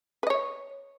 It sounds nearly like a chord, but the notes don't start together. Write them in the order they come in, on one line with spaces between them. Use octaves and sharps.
B4 D#5 C#5